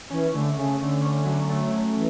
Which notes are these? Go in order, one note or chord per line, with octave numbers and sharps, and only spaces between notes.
E3 C#4
D3 A3
C#3 A3
D3 A3
C#4
F#3
A3
F#3
E3